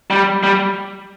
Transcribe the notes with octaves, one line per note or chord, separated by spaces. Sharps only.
G3
G3